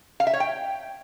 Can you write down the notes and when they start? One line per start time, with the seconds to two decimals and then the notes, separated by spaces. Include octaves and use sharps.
0.20 F5
0.27 E5
0.33 C#5
0.40 G5